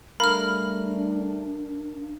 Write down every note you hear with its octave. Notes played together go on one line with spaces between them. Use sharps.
G3 A3 D4 A#4 F5 B5 F6